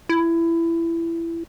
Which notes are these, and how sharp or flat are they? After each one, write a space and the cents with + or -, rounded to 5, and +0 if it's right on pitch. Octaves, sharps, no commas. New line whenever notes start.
E4 +20